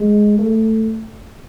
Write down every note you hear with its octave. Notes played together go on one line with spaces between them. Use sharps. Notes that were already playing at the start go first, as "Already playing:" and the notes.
Already playing: G#3
A3